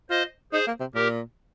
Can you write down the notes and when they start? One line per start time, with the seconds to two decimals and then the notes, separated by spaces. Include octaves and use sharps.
0.10 F4 C5 D#5
0.52 D#4 G#4 C5
0.67 A#3
0.80 C3
0.95 A#2 G4 A#4